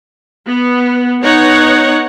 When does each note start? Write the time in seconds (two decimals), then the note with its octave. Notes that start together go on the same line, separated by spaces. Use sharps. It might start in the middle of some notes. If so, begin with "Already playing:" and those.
0.46 B3
1.21 B3 D#4 C#5 F#5